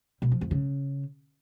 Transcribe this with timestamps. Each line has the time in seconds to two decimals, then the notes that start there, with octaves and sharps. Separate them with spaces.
0.22 B2
0.32 F3
0.41 F2
0.51 C#3